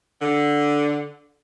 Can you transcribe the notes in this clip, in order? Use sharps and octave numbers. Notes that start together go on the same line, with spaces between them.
D3